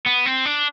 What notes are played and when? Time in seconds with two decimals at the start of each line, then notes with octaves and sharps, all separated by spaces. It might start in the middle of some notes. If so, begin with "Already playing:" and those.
0.06 B3
0.26 C4
0.46 D4